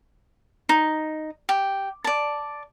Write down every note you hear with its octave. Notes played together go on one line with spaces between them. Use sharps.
D#4
G4
D5 A5